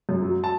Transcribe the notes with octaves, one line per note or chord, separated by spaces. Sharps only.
F#2
F#3
A5